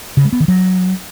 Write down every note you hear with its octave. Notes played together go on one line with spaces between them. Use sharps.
C#3
G#3
B3
D#3
F#3